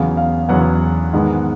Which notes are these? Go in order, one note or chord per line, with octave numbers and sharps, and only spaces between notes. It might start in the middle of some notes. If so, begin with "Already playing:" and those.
Already playing: E2 C#3 F#3 B3 F5
F5
E2 C#3 F#3 B3 F#5
G#2 D#3 G#3 B3